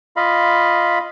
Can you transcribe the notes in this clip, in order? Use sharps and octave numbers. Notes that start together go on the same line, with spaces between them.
F4 D#5 F5 B5